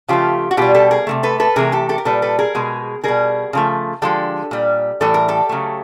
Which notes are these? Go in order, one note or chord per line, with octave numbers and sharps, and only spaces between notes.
C#3 F3 A3 F4 G4
F#4
B2 G3 F4 G4
G4 A4
G#4 A#4
C3 E3 A3
A4 B4
A4 B4
C3 E3 A3 G#4 A#4
G4 A4
G4 A4
A#4
A#2 G3 A4 B4
A4 B4
G#4 A#4
B2 G#3
B2 G3 G#4 A#4
C#3 F3 A3
D3 F3 G#3 G4 A4
A#2 G3
A2 E3 G3 A4
A#4
G4 A4
C#3 F#3 A3